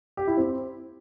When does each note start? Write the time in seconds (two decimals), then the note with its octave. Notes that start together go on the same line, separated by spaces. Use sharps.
0.17 G4
0.27 E4
0.37 C4